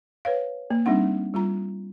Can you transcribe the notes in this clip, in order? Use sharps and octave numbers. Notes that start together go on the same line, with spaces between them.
B4 C#5 F5
A#3
G3 C4 D4 D#4 F#5
G3 F4 A#5